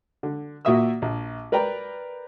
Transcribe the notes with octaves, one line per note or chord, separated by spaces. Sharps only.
D3
A#2 A#3 F#4 E5 D#6 E6
A#1
A#4 B4 D5 G5 A#5